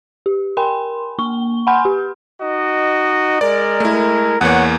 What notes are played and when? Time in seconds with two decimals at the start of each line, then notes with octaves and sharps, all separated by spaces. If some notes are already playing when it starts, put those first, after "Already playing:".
0.26 G4
0.57 A#4 G5 G#5 B5 C6
1.19 A#3 C#6 G7
1.67 F#5 G#5 B5 C6 F6 G6
1.85 G4
2.42 D#4 F#4 D#5
3.41 G#3 A#4 D5
3.80 A3 E4
4.41 E2 E3 A#3 C#5 F#5